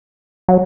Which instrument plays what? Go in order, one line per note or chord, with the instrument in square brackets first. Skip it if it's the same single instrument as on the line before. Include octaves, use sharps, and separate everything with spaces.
[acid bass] F#3